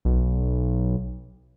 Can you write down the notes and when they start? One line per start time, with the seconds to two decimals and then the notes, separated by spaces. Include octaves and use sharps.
0.05 B1